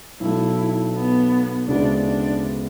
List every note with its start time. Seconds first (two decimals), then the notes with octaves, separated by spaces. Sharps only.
0.20 B1 B2 A3 E4
0.94 B3
1.67 D2 C#3 G#3 B3 D4 E4
2.04 D4